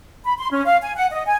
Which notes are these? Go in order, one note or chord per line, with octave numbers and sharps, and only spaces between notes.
B5
C6
C#4
F5
G#5
F#5
D#5
G#5